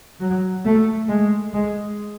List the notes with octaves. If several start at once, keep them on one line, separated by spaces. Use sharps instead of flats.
F#3
A3
G#3
G#3